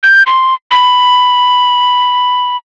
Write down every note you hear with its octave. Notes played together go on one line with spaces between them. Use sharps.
G6
C6
B5